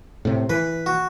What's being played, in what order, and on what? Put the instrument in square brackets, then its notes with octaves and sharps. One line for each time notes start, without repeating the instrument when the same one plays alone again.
[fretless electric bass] A2 C3
[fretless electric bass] E3 [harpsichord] B4
[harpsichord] F#4